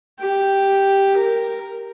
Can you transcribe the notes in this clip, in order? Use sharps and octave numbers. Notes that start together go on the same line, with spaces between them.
G4
A#4